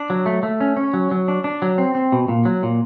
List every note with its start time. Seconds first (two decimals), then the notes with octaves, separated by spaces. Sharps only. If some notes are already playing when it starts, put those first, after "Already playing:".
Already playing: D4
0.10 F#3
0.26 A3
0.43 A3
0.61 C#4
0.76 C#4
0.94 F#3
1.11 F#3
1.28 D4
1.44 D4
1.62 F#3
1.78 C4
1.95 C4
2.12 B2
2.28 A#2
2.45 F#3
2.63 A#2